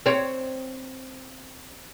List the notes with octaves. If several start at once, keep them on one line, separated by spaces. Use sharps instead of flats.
C4 C#5